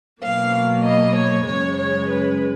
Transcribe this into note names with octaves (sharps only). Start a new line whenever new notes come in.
B2 F#3 A#3 F5
D#5
C#5
F#2 C#3 G#3 C#5
C#5
B4